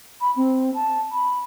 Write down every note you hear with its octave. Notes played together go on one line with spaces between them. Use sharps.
B5
C4
A5
B5